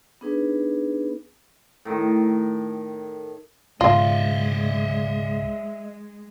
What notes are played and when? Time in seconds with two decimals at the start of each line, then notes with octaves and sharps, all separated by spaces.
0.21 B3 D4 D#4 G#4 B4
1.85 A2 D#3
3.81 C#2 G#2 B2 G#3 F4 D#5 E5